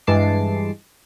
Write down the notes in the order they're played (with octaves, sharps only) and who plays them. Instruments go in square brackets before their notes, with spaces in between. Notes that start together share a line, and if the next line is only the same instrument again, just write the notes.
[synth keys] G2 E3 G#3 A5 D6 C7